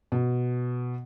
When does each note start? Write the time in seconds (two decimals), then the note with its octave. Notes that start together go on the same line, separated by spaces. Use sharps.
0.12 B2